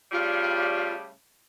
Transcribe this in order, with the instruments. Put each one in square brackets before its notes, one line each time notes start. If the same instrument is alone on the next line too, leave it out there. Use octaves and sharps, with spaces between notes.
[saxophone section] A2 C#3 G3 [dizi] F4